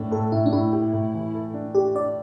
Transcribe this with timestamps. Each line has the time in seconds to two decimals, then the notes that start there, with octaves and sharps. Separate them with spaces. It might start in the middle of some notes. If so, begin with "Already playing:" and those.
Already playing: A2 A3 D4
0.11 A2 A4
0.32 A2 E4
0.46 D4
0.53 A2 E4
0.72 G4
0.93 A2
1.14 E3
1.34 A4
1.54 D4
1.75 D4 G4
1.95 D4 D5